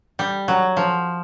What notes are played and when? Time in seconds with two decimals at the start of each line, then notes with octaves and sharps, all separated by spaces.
0.19 G3
0.48 F#3
0.77 F3